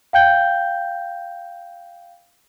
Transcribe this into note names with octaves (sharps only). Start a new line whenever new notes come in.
F5 G5 G6 G7